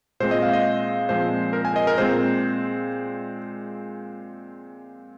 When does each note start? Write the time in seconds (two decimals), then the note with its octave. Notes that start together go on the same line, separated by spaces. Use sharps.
0.20 A#2 G#3 C4 C5
0.31 D#5
0.43 F5
0.53 D#5
1.09 A#2 F3 G#3 C4 C5
1.53 A#4
1.65 G#5
1.76 D#5
1.87 A#4
1.98 A#2 G#3 C4 C5